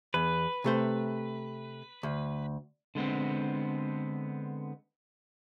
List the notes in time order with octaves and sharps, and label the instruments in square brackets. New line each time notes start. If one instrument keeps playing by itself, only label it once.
[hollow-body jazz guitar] E2 [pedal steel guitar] B4
[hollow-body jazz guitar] C3 A3 C5
D2
[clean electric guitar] D3 G#3 B3 C4